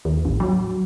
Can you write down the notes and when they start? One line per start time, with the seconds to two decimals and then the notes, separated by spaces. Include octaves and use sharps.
0.05 D#2
0.25 A1
0.40 F#3